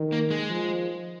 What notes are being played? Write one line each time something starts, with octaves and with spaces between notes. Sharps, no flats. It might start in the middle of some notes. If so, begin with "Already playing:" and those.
Already playing: D#3
A#3
G#3
F3